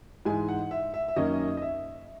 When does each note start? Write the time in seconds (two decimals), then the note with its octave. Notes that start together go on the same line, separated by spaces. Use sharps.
0.25 G#2 E3 G#3 G#5
0.48 F#5
0.71 E5
0.94 E5
1.08 E5
1.16 F#2 D#3 A#3 C#4 D#5
1.57 D#5
1.62 E5